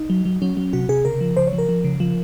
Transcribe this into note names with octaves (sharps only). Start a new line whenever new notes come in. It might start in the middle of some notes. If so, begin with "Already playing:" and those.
Already playing: D#4
F#3
F#3
F#3 C#4
F#3
C3 F#4
C3 G#4
C#3 A#4
F3
C#3 C5
C#5
F3
A#4
F3
C#3
F3